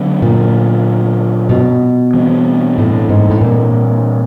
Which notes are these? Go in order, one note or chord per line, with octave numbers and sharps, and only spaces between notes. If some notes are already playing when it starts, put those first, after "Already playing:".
Already playing: D3 F#3 B3 D4
A#2
B2
E3 G3 C4
A2
G#2
A2
A#2